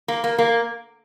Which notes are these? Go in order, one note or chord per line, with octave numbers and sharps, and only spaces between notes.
A#3
A#3
A#3